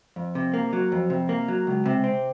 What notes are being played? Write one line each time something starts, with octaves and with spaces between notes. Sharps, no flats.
F2
C3
A#3
F#3
F2
C3
A#3
F#3
C#2
C3
C4